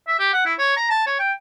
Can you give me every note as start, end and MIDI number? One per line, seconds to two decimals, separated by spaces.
0.08 0.17 76
0.19 0.29 67
0.33 0.45 78
0.46 0.53 64
0.59 0.76 73
0.77 0.90 82
0.90 1.06 81
1.06 1.15 73
1.19 1.32 79